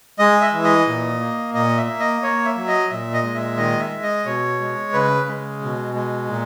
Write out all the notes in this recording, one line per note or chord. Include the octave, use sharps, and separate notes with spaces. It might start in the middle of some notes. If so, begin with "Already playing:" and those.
G#3 D#5
E5
E3
D#5
A#2
A#3
A#2 D#5
E5
A#3
D#5
A#3 C#5
E5
F#3
D#5
A#2 E5
D#5
G#3
E5
D#3 D#5
E5
G#3
D#5
B2 C#5
G#3
C#3 B4
G#3
B2
G#3
A#2